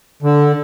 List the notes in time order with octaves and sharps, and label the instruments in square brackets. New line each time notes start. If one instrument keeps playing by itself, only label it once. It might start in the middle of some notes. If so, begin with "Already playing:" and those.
[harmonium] D3